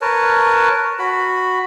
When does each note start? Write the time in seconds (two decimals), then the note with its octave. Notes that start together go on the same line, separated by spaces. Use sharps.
0.01 A#4 B4 C#5 A5
0.99 F#4 B5